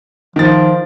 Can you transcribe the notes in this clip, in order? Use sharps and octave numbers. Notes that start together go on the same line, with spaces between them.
D#3 F3 A6